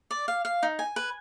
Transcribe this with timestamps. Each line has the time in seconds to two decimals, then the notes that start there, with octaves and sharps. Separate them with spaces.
0.11 D5
0.28 F5
0.45 F5
0.63 D#4
0.79 G#5
0.96 B4